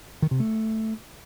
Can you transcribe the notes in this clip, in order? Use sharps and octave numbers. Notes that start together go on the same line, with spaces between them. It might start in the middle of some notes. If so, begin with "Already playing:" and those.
D#3
C3
A3